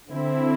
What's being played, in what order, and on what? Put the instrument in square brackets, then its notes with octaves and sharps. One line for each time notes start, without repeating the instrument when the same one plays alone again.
[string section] D3 C4 E4